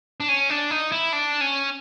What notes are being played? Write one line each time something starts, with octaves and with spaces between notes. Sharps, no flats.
D4
C#4
D4
D#4
E4
D4
C#4